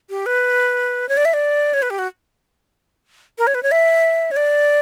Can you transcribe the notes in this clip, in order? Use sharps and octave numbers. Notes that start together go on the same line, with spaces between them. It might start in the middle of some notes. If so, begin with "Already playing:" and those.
G4
B4
C#5
D5
E5
D5
C#5
B4
G4
F#4
A#4
C#5
B4
C#5
E5
C#5
D5